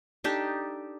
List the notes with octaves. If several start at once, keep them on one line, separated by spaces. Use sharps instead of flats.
D4 D#4 G4 A4